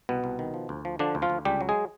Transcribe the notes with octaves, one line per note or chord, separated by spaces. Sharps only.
C2 B2 B3
C2
D#3
F3
D2
F3
D3 F3 D4
D2
F3 F4
D2
C#2 G3 G4
F#3
G#3 G#4